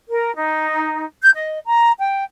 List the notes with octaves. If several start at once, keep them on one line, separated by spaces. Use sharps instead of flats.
A#4
D#4
G6
D#5
A#5
G5